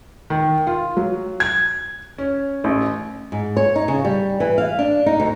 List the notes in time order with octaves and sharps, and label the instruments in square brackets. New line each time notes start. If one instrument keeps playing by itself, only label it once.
[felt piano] D#3
F4
F#3
G#6
C#4
A1
[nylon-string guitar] G#2
C#5
D#4
C#3
G3
E3
F5
D4
D#4
D2